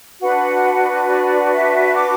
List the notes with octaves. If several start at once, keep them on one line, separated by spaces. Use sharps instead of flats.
D4 F#4 B4 F#5
D5
E5
D6